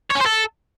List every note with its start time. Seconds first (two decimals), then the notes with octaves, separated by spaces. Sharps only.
0.10 C#5
0.15 C#4
0.20 C5
0.26 A4